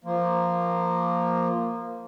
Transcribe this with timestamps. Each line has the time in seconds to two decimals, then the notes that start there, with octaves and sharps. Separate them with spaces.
0.04 F3 A#3